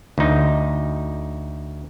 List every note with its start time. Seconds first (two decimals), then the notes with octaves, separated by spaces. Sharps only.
0.18 D2 D#4